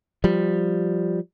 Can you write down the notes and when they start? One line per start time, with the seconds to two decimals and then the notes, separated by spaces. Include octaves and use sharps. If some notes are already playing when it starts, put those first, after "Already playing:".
0.24 F3 G3